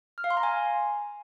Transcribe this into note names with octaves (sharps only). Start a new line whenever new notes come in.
F6
F5
C6
A#5
G#5